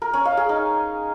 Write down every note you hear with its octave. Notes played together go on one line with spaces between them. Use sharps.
A#4
C#4
F5
G#4
D#4